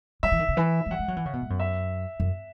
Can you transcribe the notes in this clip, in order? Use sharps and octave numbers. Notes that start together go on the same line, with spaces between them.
F#3 E5
E3
D#3
C#3
E3
G#3
F#3 F#5
G#3
F#3
E3
C#3
B2
G#2
F#2
E5
F#2